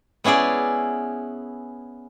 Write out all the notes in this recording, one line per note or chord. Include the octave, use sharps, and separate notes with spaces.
B3 C#4 E4 G#4 D5